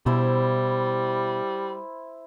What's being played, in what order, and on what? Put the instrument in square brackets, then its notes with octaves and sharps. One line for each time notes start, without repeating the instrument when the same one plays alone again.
[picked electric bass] B2 [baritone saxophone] G3 [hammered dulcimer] E4 C5